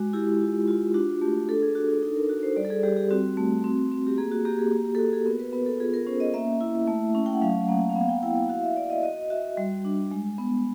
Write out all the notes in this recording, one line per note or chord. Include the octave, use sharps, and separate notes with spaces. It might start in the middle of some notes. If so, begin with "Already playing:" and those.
Already playing: G#3 F#4
E4 G4
F4
F4
D4 F#4
A3 G4
D4 A4
G#4
D4 F#4
F#4
D#4 A4
A#4
F#4
C5
G3 D5
A4
G#4
G3 G4
G4
C4 F#4
A3
C4
C4
G4
A#3 G#4
F#4
A#3 G4
G#4
F#4 G4
G4
A4
F#4 G#4
G#4
B3 A#4
B4
B3 B4
A4
F4 G#4
A#4
C#4 C5
D#5
A#3 E5
E4
A3
C#4
G5
F#5
F#3 F5
A#3 F#5
F5
B3 F#5
G5
E4 G5
F#5
F#4 F5
E5
F#4 D5
D#5
F#4 D#5
F#4 E5
G3
D4
G#3
B3